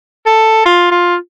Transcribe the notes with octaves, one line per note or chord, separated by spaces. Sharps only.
A4
F4
F4